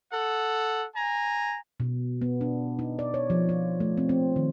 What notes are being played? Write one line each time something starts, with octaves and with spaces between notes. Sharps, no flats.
A4 F#5
G#5 A#5
B2
B3
D4
D#4
D5
C#5
F3
F4
A3
C4
C4
D#3